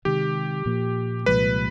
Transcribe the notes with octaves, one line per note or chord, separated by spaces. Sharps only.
C3 D#3 G#3 G4
A#2 F3 A#3
C2 A#2 F3 G#3 B4